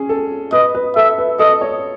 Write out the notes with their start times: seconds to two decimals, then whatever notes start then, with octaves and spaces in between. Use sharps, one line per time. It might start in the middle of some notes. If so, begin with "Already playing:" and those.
Already playing: C#4 G#4
0.09 A4
0.52 B4 D#5
0.75 B4
0.96 A4 E5
1.18 B4
1.39 A4 D#5
1.61 C#5